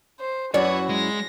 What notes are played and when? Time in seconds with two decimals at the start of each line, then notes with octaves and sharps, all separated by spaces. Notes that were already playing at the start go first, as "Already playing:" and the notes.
0.20 C5
0.54 F#2 E4 F#4 B4 C#5 D5
0.89 G#3 A#6